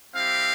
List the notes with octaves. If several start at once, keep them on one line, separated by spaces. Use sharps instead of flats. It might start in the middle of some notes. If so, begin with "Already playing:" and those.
G3 C4 E4 G4 F5